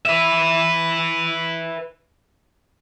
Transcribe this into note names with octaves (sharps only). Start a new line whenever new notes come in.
B4 E5